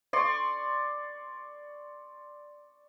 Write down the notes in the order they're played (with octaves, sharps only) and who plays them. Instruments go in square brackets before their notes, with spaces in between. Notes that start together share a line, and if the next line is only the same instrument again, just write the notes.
[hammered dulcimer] D5 C6 C#6